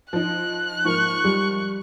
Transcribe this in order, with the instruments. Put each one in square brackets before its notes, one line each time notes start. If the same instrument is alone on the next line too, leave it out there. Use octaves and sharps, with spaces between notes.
[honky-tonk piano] F3 D#4 [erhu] F#6
[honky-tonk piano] G#2 F3 A#3 [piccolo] C#6
[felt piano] G3